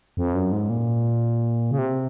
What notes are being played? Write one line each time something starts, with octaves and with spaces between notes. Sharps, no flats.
F2
F#2
G#2
A#2
C#3
C3